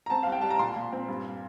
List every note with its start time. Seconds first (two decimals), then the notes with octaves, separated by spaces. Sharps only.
0.06 A#5
0.10 C4 A5
0.23 C2 F5
0.32 G5
0.41 G3 A5
0.50 A#5
0.59 A#2 C6
0.76 A#2
0.93 C4
1.08 G2